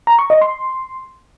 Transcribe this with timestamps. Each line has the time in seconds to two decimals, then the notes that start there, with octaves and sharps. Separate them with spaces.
0.07 A#5
0.19 C#6
0.30 D#5
0.41 C6